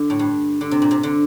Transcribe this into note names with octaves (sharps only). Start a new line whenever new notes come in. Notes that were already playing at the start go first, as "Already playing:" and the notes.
Already playing: D3
A2
G2
D3
C3
A#2
C3
D3